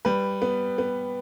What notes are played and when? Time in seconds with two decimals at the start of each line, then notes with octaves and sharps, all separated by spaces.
0.05 G3 B4
0.42 B3
0.78 B3